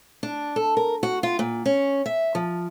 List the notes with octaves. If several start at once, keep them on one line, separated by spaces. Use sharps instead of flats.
D4
A4
A#4
F#4
F4
A#2
C#4
E5
F3